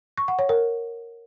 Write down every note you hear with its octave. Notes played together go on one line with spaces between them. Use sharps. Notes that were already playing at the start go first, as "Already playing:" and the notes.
C#6
F#5
C#5
A#4